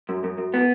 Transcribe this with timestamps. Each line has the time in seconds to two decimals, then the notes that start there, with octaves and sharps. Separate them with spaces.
0.09 F#2
0.24 F#2
0.38 F#2
0.54 B3